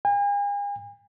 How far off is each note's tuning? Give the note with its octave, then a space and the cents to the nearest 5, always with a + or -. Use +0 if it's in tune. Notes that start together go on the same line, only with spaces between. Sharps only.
G#5 -45